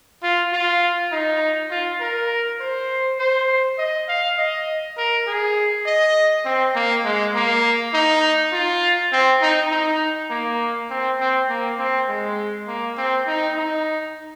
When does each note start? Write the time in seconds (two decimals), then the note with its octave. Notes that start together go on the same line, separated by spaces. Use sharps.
0.23 F4
0.53 F4
1.12 D#4
1.71 F4
2.01 A#4
2.60 C5
3.19 C5
3.78 D#5
4.08 F5
4.38 D#5
4.97 A#4
5.27 G#4
5.86 D#5
6.45 C4
6.75 A#3
7.05 G#3
7.34 A#3
7.94 D#4
8.53 F4
9.12 C4
9.42 D#4
9.71 D#4
10.30 A#3
10.90 C4
11.20 C4
11.49 A#3
11.79 C4
12.08 G#3
12.68 A#3
12.97 C4
13.27 D#4
13.57 D#4